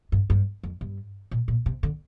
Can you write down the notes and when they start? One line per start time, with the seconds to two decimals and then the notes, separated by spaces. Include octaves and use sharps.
0.12 G2
0.30 G2
0.63 F2
0.81 G2
1.31 A#2
1.48 A#2
1.66 C3
1.83 D3